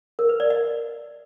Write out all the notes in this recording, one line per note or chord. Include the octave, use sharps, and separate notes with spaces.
A#4
B4
D5
D#5